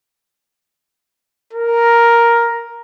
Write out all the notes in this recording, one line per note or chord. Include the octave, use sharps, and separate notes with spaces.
A#4